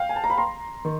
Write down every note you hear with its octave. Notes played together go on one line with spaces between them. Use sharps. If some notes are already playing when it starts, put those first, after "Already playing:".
Already playing: F5 G5
G#5
A5
A#5
B5
A#5 C6
D#3